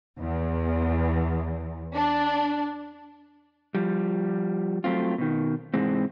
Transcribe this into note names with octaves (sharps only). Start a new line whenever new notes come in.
E2
D4
F3 G3
F#3 A3 C4 F4
B2 D#3
G#2 C3 E3 G#3 C4